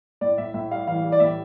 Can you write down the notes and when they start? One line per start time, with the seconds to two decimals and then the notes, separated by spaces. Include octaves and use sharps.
0.21 A2 D5
0.38 A2 E5
0.54 A2 E5
0.71 G3 F5
0.87 E3 F5
1.04 G3
1.12 D5
1.20 A2 E5